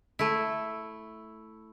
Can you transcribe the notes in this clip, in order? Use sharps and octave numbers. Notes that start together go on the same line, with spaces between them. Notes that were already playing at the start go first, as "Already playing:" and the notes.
A3 E4